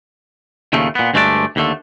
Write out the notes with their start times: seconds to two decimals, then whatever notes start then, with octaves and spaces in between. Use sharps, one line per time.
0.73 D#2 A#2 C#3 A3
0.95 A#2 B3
1.14 D2 G2 G#3 A3 D4 D5
1.56 D#2 D3 A3